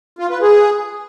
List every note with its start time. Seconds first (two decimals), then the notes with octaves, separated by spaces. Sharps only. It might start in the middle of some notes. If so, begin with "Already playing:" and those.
0.19 F4
0.30 B4
0.41 G#4